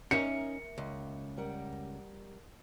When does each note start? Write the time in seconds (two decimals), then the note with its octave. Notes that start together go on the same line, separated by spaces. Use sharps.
0.11 D#2 C#4 D#4 A#4 E5 C#7
0.78 C#2
1.37 G3 A#4 F#5